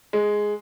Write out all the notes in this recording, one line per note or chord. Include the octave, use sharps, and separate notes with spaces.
G#3